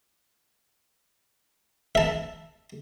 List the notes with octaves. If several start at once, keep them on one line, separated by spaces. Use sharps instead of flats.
E5 A5